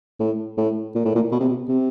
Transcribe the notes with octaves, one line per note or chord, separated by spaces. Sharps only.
A2
A2
A#2
A2
A#2
B2
C3
B2
C3